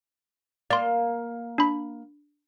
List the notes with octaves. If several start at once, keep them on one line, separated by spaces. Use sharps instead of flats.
A#3 D5 F5 C6
D4 B5